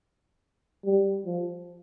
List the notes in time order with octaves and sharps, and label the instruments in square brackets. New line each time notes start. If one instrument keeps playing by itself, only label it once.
[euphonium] G3
F3